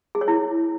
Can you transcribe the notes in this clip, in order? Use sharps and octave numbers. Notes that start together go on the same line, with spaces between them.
G#4
C#5
E4